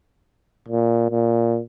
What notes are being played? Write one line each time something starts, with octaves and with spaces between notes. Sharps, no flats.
A#2
A#2